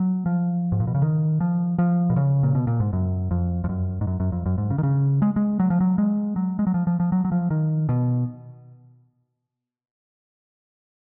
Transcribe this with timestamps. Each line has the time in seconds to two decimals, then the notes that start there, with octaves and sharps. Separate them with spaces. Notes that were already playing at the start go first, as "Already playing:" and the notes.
Already playing: F#3
0.26 F3
0.72 G#2
0.80 A#2
0.87 B2
0.95 C#3
1.02 D#3
1.40 F3
1.79 F3
2.10 B2
2.16 C#3
2.43 A#2
2.55 B2
2.67 A#2
2.80 G#2
2.93 F#2
3.31 F2
3.64 F2
3.69 F#2
4.01 G#2
4.07 F#2
4.20 F#2
4.32 F2
4.46 F#2
4.58 G#2
4.70 C#3
4.78 D#3
4.83 C#3
5.22 G#3
5.36 G#3
5.60 F#3
5.70 F3
5.80 F#3
5.98 G#3
6.36 F#3
6.59 G#3
6.67 F#3
6.74 F3
6.87 F3
7.00 F3
7.12 F#3
7.25 F#3
7.32 F3
7.50 D#3
7.89 B2